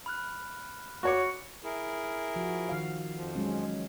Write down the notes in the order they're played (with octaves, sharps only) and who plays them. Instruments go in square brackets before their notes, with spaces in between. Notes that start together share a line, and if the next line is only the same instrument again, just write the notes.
[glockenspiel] B5 F6 F#6
[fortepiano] F#4 C#5 D6 [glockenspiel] C#6 C#7
[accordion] E4 G#4 A#4
[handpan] F3 F#4
D#3 F5
[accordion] F2 F3
[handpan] F#3 G#3 C#4